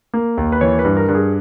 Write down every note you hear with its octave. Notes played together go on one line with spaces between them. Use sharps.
A#3
D#2
B4
E3 C#5
B4
G2
A#4
G2
G#4